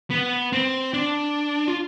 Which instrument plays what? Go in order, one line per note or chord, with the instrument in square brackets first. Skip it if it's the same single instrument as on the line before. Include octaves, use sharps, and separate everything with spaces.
[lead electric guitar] B3
C4
D4
F4